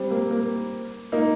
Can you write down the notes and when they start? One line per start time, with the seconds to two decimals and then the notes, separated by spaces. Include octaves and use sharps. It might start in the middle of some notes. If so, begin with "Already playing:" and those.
Already playing: G3 C4
0.10 A#3
0.31 A#3
1.12 A#3 D#4